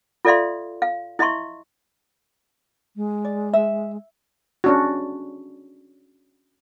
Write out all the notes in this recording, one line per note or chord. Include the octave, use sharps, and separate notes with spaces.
F4 A4 D5 E5 F5 C6
F5
E4 D#5 E5 C6 C#6
G#3
D5
E5
C#4 D4 F#4